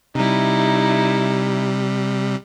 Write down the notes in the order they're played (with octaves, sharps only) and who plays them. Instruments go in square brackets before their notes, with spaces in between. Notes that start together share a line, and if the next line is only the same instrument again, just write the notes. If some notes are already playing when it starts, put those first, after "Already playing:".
[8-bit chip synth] C3 G3 [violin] D#4 E4